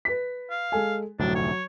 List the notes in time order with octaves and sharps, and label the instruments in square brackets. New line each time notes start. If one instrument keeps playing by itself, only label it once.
[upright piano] B4 B6
[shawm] F5
[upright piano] G#3 A4 G#5
[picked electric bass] F1 D2 A2 [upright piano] F#3 [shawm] D4
[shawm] C#5